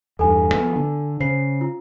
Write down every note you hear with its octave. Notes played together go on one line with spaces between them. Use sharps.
E2 G2 A4 G#5
F3 B3
D3
C#3 C5 C7
F4